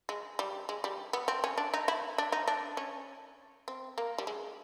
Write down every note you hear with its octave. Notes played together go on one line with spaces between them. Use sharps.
G#3
G3
G#3
G3
B3
C4
C#4
D4
D#4
E4
D4
D#4
D4
C#4
C4
A#3
G3
G#3